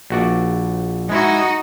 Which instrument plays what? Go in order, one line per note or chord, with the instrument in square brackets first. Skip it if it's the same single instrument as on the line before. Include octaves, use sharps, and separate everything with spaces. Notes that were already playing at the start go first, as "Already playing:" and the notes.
[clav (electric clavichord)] A#1 F#4 D5
[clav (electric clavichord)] G#3 E4 [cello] D#4 F#4